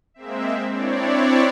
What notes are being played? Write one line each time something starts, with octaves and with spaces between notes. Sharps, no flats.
G#3 A#3 C4 E5
C4 D4 E4 C#5 D5